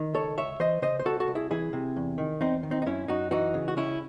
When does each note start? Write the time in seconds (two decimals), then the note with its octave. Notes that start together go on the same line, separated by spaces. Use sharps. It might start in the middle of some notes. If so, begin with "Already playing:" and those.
Already playing: D#3
0.14 C#2 A4 C#5
0.38 C#2 C#5 E5
0.60 E3 C5 D#5
0.82 C#3 C5 D#5
0.99 C5
1.05 C2 F#4 A4
1.20 F#4 A4
1.28 C2
1.35 E4 G#4
1.51 E3 E4 G#4
1.73 C3
1.96 E2
2.18 D#3
2.41 E2 C4 D#4
2.63 D#3
2.71 C4 D#4
2.82 D#4
2.86 F#2 C#4 E4
3.08 F#2 D#4 F#4
3.31 E3 D#4 F#4
3.54 C#3
3.68 F#4
3.77 C#2 C#4 E4